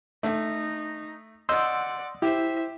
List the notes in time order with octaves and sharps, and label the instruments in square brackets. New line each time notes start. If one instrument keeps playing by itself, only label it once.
[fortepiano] A3 [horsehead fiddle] D#4
[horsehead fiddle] D5 F#5 [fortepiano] D#5 [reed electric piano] C6 E6 G6
[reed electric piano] E4 [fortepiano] G4 [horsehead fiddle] C5 E5